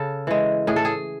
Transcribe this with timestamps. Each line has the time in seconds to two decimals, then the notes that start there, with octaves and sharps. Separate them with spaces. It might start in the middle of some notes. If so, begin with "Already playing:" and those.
Already playing: C#3 A4
0.27 E3 G#3
0.67 A2 G#4
0.76 A4
0.85 G#4